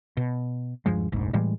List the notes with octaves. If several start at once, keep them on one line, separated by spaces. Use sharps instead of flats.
B2
D#1 G2 F3 G#3
F1 A#1 G#2
A2 E3 G3 G#3